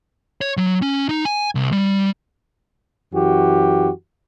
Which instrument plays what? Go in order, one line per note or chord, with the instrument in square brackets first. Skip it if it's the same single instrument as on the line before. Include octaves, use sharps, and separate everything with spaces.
[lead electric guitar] C#5
F#3
C#4
D#4
G#5
C2
G3
[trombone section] F#2 E3 F#4 G4